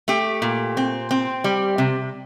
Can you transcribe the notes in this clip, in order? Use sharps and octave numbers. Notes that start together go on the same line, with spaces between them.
A3 G4
A#2
C4
C4
G3
C3